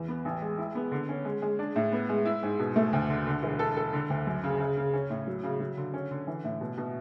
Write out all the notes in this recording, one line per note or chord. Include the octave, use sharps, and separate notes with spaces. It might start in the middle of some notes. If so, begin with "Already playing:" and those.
Already playing: E2
B3
A1
G#3
E4
B3
D3
C#4
G#3
G#3
D4
A2
B3
G#3
E4
G#2
B2
A3
D2
D3
D3
E1
A4
A4
D3
D2
F#2
C#3
C#3
C#3
C#4
A2
F#3
C#3
F#3
D3
C#4
D3
E3
A2
B2
B2